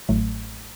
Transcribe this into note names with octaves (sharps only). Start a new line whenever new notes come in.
A1 A2 F#3 A3